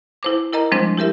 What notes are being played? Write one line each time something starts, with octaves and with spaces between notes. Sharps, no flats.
E4 C5 D6
E4 A#4 D#5 A#5
F3 G3 G#3 C4 D4 C5
E4 G4 A#4 E5